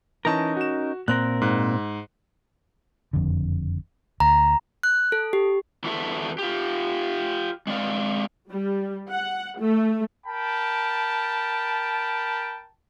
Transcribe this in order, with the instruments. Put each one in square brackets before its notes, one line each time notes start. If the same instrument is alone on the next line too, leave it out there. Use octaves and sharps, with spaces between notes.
[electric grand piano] E3 A5 [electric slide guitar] C#4 D#4 A#4
[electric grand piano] F#4 E7
[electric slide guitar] A#2 C4 A#4 [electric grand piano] F#6
[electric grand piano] G#2 F#6
[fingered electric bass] F#1 F2 D3
[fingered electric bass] D2 [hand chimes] A#5
[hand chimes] F#6
A4
G4
[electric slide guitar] E2 E4 F#4 A4 E5
F4 G4
G#3 C4 D5 F5
[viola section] G3
F#5
A3
[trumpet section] A#4 G5 A5 B5